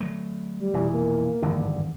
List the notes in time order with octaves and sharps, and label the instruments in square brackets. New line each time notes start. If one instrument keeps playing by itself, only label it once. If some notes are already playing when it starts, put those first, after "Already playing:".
[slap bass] F#3 A3
[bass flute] G3
[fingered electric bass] F1 E3 [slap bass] B2
[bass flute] A#3
[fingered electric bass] G#1 G2 D3 [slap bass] E2 D#3